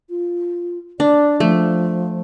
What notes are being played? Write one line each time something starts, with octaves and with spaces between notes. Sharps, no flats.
F4
D4 D5
F3 A3